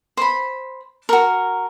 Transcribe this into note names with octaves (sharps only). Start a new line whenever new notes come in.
C5 B5
F#4 A#4